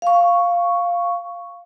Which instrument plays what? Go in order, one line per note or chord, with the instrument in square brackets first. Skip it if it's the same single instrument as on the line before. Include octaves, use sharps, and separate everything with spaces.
[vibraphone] F5 C#6